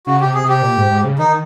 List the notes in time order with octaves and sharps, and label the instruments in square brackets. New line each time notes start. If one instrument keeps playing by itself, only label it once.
[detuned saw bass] C#3 [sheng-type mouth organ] F#4
[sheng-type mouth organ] G4
[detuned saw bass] C3
[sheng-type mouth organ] G#4
[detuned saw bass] C3 [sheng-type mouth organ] G4
[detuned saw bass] A#2
G#2
G#2
C#3
[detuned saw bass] D#3 [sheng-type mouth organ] D#4